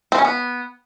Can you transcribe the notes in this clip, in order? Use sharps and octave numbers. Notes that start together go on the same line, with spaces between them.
C4
C#4
B3